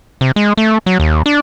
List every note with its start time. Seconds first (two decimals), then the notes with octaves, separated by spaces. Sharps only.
0.21 C3
0.36 G#3
0.58 A3
0.86 F#3
1.00 D#2
1.26 D4